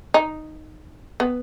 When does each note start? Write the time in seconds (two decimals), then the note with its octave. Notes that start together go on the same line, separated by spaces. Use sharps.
0.14 D#4
1.20 B3